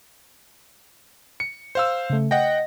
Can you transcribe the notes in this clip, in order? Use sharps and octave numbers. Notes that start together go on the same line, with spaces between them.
C#7
C5 F5 E6
C#3 A3
D#5 F#5 G5 A#6